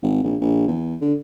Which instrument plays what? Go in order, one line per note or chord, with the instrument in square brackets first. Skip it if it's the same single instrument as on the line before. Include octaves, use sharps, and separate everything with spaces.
[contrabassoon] G#1
A#1
A#1
E2
D3